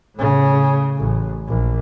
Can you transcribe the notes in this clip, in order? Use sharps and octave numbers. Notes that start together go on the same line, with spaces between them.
A2 C#3
A1
A#1